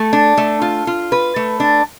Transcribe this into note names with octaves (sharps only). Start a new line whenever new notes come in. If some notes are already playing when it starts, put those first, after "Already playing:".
Already playing: A3
D4
A3
F4
F4
B4
A3
D4